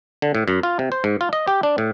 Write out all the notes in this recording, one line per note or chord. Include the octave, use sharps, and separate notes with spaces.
D3
A2
F#2
F4
C3
C5
G#2
F4
D#5
G4
D4
A2